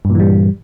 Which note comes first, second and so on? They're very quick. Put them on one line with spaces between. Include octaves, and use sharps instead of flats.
G2 A#2 E3 G3